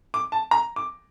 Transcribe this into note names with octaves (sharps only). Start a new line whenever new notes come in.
D6
A5
A#5
D6